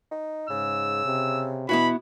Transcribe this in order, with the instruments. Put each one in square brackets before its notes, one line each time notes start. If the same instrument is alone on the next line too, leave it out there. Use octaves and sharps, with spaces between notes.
[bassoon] D#4
[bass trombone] G#2 [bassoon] C#3 [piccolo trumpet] E6
[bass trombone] C3
[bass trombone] B2 [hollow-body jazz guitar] B3 E4 F#4 [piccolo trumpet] B5